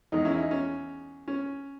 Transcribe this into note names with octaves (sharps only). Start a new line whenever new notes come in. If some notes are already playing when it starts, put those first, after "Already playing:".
E2 D#3 G#3 D#4
C#4 E4
D#4
C#4
C#4